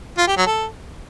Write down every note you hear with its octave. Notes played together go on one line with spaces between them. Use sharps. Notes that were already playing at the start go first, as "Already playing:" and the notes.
F4
G4
F#3
A4